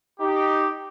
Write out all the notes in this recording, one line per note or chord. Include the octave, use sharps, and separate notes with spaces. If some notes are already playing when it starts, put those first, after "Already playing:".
D#4 G4